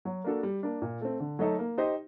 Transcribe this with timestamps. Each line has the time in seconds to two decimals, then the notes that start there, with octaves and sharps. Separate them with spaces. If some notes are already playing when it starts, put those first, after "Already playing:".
0.05 F#3
0.24 A#3 D4 F#4 A4
0.43 G3
0.63 A#3 D4
0.82 A#2
1.01 A3 C4
1.20 D3
1.39 F#3 A3 D#4 A4
1.59 A#3
1.78 D#4 G4 C5 D#5